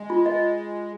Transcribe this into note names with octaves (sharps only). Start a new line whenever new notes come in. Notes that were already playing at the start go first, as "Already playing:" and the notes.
Already playing: G#3
F4
D#5